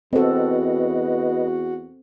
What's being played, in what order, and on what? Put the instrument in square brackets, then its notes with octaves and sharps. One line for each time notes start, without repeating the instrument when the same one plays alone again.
[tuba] E2 [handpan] C4 A4 [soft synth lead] F#4 [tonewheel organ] B4 D#5